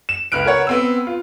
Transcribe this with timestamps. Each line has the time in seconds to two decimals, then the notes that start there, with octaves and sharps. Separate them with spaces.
0.09 E7
0.32 C#2 B4 F6 F#6 D7
0.46 A#4 B4 C#5 F#5 G#6
0.67 B3 C4 E6
1.07 F4